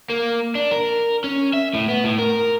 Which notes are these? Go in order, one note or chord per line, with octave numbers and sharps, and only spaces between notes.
A#3
D4
A#4
C#4
E5
A2
B3
A2
A#4